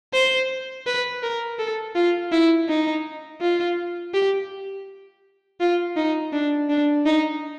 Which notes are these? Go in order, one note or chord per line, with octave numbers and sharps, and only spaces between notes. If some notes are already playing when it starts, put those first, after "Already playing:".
C5
B4
A#4
A4
F4
E4
D#4
F4
G4
F4
D#4
D4
D4
D#4